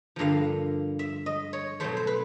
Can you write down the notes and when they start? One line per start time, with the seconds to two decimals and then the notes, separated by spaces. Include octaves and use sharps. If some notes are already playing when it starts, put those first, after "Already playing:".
0.16 G2 D3 F3 A#3 F5
0.99 E5
1.26 D#5
1.53 C#5
1.80 B2 F#3 A3 C5
1.97 C5
2.07 B4